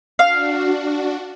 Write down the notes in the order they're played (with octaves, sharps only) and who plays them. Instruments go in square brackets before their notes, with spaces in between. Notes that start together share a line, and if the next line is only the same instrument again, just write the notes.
[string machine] D4 F#4 [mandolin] F5